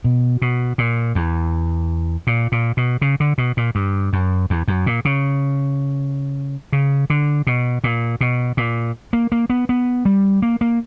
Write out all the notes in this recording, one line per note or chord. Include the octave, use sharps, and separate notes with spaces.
B2
B2
A#2
E2
A#2
A#2
B2
C#3
D3
B2
A#2
G2
F#2
E2
F#2
A#2
C#3
C#3
D3
B2
A#2
B2
A#2
A#3
A#3
B3
B3
G3
A#3
A#3